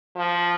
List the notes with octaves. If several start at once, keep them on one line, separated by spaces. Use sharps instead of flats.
F3